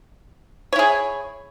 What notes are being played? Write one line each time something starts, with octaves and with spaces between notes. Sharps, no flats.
E4 G#4 C#5